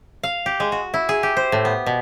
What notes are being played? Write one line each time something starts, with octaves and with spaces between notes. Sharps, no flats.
F5
G4
G#3
F#4
E4
G#4
G4
C5
A2
B3
B2